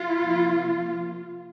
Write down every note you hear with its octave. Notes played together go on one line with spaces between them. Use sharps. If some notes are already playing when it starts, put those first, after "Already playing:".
Already playing: F4
C3 F3 A#3